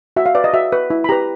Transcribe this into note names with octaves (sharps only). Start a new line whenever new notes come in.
F#4 E5
F5
B4 D5
D#5
F#4 E5
B4
E4
B5
G4 B4 A#5